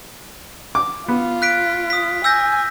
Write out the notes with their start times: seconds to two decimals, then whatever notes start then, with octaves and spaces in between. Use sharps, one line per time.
0.75 D6
1.08 B3 F4
1.42 F#6 B6 D7
1.90 D#6 B6
2.24 G#5 E6 G6 A#6